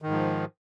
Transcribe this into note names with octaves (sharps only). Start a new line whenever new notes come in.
G#2 D#3 F3